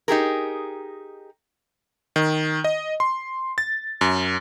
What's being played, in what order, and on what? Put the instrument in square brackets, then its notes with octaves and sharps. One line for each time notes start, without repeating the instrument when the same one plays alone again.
[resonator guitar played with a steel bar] D#4 G4 G#4 A#4
[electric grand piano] D#3
D#5
C6
A6
F#2